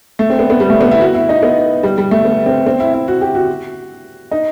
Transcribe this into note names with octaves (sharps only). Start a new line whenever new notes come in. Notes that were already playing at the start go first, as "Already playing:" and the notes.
A3
C4
B3
B3
G3
A3
B3
E4
F#4
E4
D#4
B3
G3
G3
A3
B3
C4
C4
E4
E4
F#4
G4
F#4
D#4